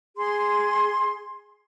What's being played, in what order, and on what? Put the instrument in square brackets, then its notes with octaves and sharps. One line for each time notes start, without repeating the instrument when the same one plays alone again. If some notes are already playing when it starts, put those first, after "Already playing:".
[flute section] G#4 C6